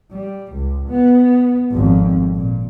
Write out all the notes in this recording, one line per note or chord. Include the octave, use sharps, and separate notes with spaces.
G3
C#2
B3
G#1 F2
A#2